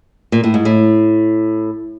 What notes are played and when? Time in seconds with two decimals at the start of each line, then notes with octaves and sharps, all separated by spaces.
0.32 A#2
0.44 A2
0.54 G#2
0.65 A2